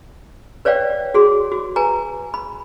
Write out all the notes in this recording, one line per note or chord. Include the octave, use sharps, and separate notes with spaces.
B4 C#5 D5 F5 G5
F#4 G#4 C6
F#4
B4 G#5 A#5
B5